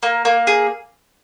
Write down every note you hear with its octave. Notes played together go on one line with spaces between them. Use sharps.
A#3
A#3
G#4